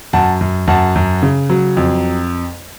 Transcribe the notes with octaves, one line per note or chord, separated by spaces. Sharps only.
F#2 F#5 A5
F#2
F#2 F#5 A5
F#2
C#3
F#3
F2